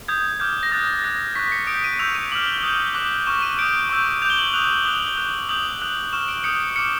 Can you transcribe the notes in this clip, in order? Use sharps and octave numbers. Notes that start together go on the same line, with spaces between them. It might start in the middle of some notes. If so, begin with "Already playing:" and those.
D#6 G6 G#6
D6 F6 G6
A#6
D#6 F#6 A6
A6
D#6 F#6 A#6
C#6 F#6 B6
C#7
D#6 G6 D7
D#7
C#6 E6 G6 F7
D#7
D6 F6 F#7
G7
D#6 G6 F#7
D6 F#6
C#6 F6 E7
D#7
D#6 G6 D7
C#6 E6 G6
D6 G6 F7
G7
F#7
D#6 F#6 F7
D#6 F#6 G7
F#7
G7
D#6 F#6
D#6 G6 F#7
D#6 F#6
C#6 F6 E7
D7
D#6 G6 C#7
C#7
D6 F6 C#7